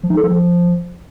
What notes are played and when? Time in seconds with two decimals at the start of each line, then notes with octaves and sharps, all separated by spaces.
0.03 F3
0.10 D#4
0.17 A4
0.24 F3